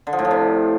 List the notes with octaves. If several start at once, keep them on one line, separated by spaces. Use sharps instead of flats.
D3
F3
A2
F3
C3